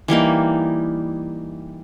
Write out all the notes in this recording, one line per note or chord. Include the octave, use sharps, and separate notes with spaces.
E3 G3 A#3 D#4